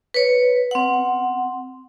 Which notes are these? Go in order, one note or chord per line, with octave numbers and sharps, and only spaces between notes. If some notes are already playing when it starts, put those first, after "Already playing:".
B4 C#5
C4 F#5